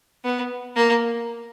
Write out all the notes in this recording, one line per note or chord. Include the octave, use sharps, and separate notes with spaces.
B3
A#3